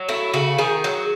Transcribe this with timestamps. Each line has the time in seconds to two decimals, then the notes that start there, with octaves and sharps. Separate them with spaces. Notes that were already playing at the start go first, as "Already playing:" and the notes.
Already playing: F#3
0.09 A3 E4
0.34 C#3 F#4
0.58 D#3 G#4
0.84 F#3